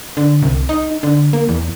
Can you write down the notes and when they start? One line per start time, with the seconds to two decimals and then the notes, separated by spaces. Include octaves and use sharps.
0.17 D3
0.42 C2
0.69 D#4
1.03 D3
1.33 A#3
1.49 E2